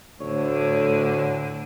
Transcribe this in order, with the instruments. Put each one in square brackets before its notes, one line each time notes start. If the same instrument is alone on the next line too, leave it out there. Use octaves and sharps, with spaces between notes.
[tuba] D2 [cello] A2 D3 [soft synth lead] C#5